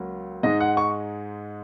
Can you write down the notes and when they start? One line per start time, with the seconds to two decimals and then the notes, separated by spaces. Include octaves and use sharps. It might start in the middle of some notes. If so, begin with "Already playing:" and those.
Already playing: C#2 F#3 A#3
0.43 G#2 G#3 D#4 D#5
0.60 F#5
0.77 C#6